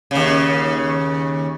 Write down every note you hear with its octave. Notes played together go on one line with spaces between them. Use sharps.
D#2 C#3